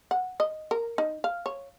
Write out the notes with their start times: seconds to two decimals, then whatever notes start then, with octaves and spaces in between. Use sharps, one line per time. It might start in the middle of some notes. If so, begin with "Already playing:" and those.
0.11 F#5
0.40 D#5
0.71 A#4
0.98 D#4
1.24 F5
1.46 C#5